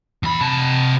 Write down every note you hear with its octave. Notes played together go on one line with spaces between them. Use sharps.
E2 B5
C3 A5